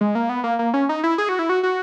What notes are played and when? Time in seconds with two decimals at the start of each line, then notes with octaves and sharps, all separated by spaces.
0.01 G#3
0.15 A#3
0.29 B3
0.44 A#3
0.59 A#3
0.74 C#4
0.89 D#4
1.04 E4
1.18 G#4
1.29 F#4
1.39 E4
1.49 F#4
1.63 F#4